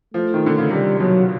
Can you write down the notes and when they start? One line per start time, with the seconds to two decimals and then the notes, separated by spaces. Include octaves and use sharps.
0.14 F3 A3
0.34 D#3
0.46 D3
0.58 C#3
0.71 C3 G3
0.99 B2 F#3